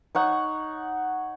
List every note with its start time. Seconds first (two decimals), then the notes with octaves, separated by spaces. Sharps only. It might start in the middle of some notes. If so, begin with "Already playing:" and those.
0.15 D#4 C#5 F#5